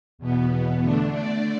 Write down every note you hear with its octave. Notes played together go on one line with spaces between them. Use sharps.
E2 B2 B3
D3 A3 D4
D5